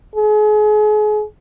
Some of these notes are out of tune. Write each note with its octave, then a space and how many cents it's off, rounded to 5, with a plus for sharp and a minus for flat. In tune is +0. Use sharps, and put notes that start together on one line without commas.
G#4 +35